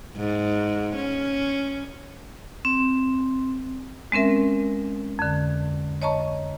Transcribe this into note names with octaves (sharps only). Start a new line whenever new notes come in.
G#2
C#4
C4
G#3 C4 C#4 A#4 E5
F2 D3
C#5 D#5 A5 A#5 C#6